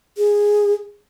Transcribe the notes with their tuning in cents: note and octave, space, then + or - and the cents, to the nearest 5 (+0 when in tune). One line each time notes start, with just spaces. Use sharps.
G#4 -10